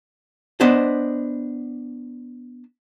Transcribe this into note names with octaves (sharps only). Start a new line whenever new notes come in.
B3 D4 C5 D#5